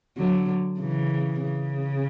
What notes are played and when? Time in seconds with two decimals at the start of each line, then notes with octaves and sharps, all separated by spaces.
0.18 D3 F#3
0.80 C#3 E3
1.43 C#3